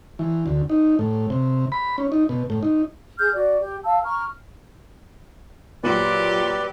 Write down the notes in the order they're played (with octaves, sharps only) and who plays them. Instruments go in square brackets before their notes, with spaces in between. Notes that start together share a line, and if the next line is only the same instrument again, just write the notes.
[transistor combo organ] E3
D2
D#4
A2
C3
B5
C#4
D#4
B2
A2
D#4
[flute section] G#4 F6 G6
F#4 D5
G4
F5 A5 E6
A#5 C#6 F6
[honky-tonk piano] A#2 [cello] F#3 G4 [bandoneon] B4 D5